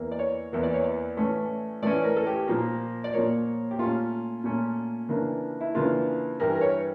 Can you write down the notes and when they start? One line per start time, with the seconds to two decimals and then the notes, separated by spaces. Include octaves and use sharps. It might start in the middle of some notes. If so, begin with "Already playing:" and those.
Already playing: E2 E3 A#3
0.11 D5
0.19 C#5
0.52 E2 E3 A#3
0.63 D5
0.74 C#5
0.84 D5
1.17 A2 E3 A3 C#4
1.82 A2 E3 A3 C#4 D5
2.04 A#4
2.16 A4
2.27 G4
2.48 A#2 F3 A#3 A#4
3.04 D5
3.13 A#2 F3 A#3 C#5
3.71 G4
3.78 A#2 A3 C#4 F4
4.44 A#2 A3 C#4
5.09 C#3 E3 A#3 D4
5.61 E4
5.75 C#3 E3 A#3 D4 F4
6.40 G2 E3 G3 A#4
6.56 A#4
6.61 C#5